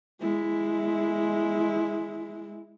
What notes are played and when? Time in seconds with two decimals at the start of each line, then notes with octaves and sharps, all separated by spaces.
0.21 G#3 E4